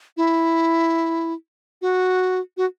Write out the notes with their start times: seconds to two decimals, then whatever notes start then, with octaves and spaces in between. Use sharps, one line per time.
0.17 E4
1.82 F#4
2.57 F#4